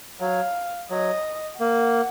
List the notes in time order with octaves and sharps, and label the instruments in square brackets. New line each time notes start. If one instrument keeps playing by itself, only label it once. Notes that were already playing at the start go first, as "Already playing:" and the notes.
[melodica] F#3 [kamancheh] F5
[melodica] F#3 [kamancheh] D#5
[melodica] A#3 [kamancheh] F#5